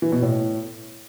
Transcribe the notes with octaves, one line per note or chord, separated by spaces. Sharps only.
E3
B2
A2